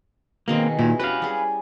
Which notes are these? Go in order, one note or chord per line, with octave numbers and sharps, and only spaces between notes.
B2 D#3 A#3 C4 G#4
A#2 D#3 E4
C#4 F#4 G4 B4 F5
G3 G#4